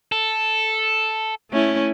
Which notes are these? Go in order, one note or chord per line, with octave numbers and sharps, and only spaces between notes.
A4
A3 C#4 E4